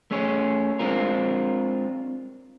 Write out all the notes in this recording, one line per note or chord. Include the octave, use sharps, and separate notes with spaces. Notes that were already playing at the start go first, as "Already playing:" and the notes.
A3 C#4 G#4 C#5
G#3 C4 D4 F4 A#4